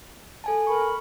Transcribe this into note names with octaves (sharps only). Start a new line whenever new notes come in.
A4 G#5 A5
A#4 B5 C#6